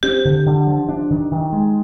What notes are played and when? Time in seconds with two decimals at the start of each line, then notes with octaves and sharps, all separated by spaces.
0.03 C4 G4
0.25 D3
0.46 D3
0.67 F3
0.89 D4
1.10 D#3
1.31 D#3
1.53 G#3